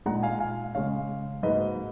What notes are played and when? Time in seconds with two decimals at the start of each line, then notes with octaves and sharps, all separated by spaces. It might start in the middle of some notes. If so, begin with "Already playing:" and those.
0.06 A#2 G#3 D#4 F#5 A#5
0.23 F5 G#5
0.40 F5 G#5
0.75 C#3 G#3 C#4 C#5 F5
1.43 G#2 F#3 A#3 D#4 B4 D#5